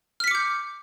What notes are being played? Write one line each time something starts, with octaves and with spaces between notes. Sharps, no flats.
D6 F6 G6 B6 C#7